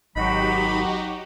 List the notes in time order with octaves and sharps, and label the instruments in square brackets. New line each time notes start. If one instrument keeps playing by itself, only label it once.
[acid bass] G#1 [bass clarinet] F#3 [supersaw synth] D#4 F#4 G4 [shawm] B5